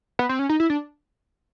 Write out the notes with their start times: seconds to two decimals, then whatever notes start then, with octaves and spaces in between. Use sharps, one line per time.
0.19 B3
0.29 C4
0.39 C#4
0.49 D#4
0.60 E4
0.70 D4